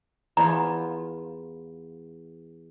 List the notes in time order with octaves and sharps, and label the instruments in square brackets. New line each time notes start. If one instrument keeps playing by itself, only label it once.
[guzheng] E2 F4 [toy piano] A#5